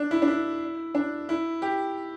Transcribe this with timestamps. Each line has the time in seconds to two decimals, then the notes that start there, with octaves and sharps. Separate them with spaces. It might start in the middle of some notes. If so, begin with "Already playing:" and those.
Already playing: D4
0.11 E4
0.22 D4
0.28 E4
0.95 D4
1.29 E4
1.62 G4